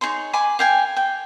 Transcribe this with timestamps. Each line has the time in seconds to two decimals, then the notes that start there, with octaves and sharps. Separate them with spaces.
0.01 D#4 G#4 C#5 C6
0.33 G#5 B5 D6
0.59 F5 G5 G#5
0.97 G5